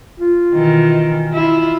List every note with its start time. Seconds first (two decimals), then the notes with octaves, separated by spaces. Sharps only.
0.20 F4
0.54 B2 D#3 E3
1.33 E4 F4